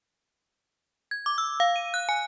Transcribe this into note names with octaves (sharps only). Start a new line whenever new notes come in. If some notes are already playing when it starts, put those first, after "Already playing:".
G#6
D6
E6
F5
D#7
F#6
G#5